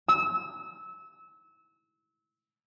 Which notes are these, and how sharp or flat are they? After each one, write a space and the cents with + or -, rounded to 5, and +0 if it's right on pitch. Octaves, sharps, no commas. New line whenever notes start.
E6 -25